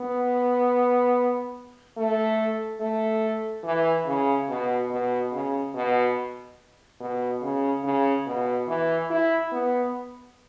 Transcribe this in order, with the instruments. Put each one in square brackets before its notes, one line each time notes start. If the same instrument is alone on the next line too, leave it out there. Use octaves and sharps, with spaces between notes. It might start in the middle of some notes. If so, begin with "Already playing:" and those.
Already playing: [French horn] B3
A3
A3
E3
C#3
B2
B2
C#3
B2
B2
C#3
C#3
B2
E3
E4
B3